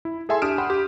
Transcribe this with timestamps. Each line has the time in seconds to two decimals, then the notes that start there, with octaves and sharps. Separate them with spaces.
0.05 E4
0.29 G#4 A4 E5 G#5 A5 C6
0.42 D4 G4 D#6 F6 D7 E7
0.58 F#5 G5 B5 C6
0.70 G4